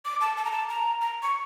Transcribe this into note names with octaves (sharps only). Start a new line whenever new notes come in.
D6
A5
A5
A#5
A5
A#5
A#5
C#6